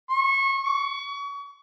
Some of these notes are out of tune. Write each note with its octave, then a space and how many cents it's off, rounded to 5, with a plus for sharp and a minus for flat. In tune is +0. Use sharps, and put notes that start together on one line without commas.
C#6 -25
C#6 +35